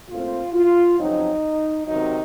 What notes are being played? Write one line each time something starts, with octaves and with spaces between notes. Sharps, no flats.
A#2 A3 C4 F4
F4
F2 C#3 F#3 C4 D#4
C3 D#3 F#3 D#4